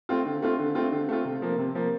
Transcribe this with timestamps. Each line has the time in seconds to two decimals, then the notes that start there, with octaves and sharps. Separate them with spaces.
0.09 A3 C4 F4
0.25 D3
0.42 A3 C4 F4
0.59 D3
0.75 A3 C4 F4
0.91 D3
1.09 A3 C4 F4
1.25 C3
1.42 F3 A#3
1.58 C3
1.75 F3 A#3